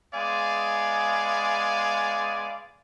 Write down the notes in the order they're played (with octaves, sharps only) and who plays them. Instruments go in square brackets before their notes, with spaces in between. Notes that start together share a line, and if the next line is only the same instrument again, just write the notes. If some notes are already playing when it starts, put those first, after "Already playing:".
[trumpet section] G#3 B3 D5 F5 G#5